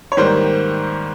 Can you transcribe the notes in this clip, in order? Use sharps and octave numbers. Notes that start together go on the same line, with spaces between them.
C#5
G#2 D#3 G3 A#3 C5